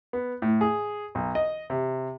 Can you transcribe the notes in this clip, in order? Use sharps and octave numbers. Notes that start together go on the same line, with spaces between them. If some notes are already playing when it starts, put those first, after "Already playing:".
B3
A2
G#4
B1
D#5
C3